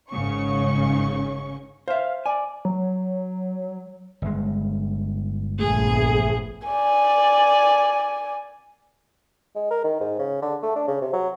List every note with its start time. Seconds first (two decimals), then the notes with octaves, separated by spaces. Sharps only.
0.11 G#1 G#2 C#3 C#4 C#6
1.88 C5 E5 F5
2.26 D5 G#5
2.65 F#3
4.22 G1 G#3
5.59 A#1 F3 A3 B3 G#4
6.67 D5 G#5
9.55 G#3
9.71 A#4
9.84 D#3
10.00 G#2
10.19 C#3
10.42 D3
10.63 A3
10.76 D4
10.88 C#3
11.01 C3
11.13 F#3